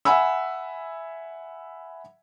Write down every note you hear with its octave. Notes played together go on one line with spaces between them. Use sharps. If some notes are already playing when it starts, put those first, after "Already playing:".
E5 F#5 G#5 B5 E6